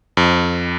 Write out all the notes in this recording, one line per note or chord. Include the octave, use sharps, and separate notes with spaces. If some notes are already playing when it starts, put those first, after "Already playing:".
F2